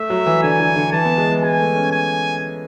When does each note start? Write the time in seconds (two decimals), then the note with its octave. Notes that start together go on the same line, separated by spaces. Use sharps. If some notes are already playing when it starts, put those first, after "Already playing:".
Already playing: A3 E5
0.10 F#3
0.26 E3
0.43 D3 G#5
0.60 D3
0.76 D3
0.92 E3 A5
1.05 B3
1.17 G#3
1.30 E3
1.42 G#3 G#5
1.59 A3
1.75 C#4
1.92 G#5